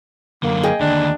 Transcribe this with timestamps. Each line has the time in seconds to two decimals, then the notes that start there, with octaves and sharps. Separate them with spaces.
0.43 F#2 D3 A#3
0.63 G#4 D#5 G5
0.81 D#2 D3 D4